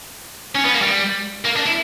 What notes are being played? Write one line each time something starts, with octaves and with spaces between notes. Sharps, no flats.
C#4
B3
A#3
G3
A#3
D4
E4